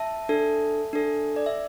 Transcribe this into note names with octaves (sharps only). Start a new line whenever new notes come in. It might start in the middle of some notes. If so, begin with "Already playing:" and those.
Already playing: E5 A5
D4 A4
D4 A4
D5
E5